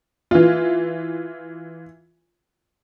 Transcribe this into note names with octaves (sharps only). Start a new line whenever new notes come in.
E3 F4